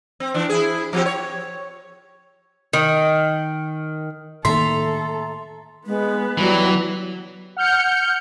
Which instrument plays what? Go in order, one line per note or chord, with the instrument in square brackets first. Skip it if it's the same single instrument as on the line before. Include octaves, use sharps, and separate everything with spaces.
[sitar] C4
E3 D4
E4 G#4
F3 C4 G4
C#5
[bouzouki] D#3
[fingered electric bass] A2 D#3 A#3 [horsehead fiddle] A4 [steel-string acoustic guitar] E5 A#5 [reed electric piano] C6
[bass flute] G#3 [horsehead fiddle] B3 B4
[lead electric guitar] E3 [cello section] F#3 [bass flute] G3
[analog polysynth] F#5 F6 G6 C#7